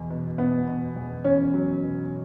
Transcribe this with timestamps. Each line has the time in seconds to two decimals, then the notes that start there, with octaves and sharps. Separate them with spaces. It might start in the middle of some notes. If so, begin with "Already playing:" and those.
Already playing: E2 B2
0.10 B2
0.38 B2 B3
0.68 B2
0.96 E2
1.24 E2 C#4
1.54 F#3
1.82 B2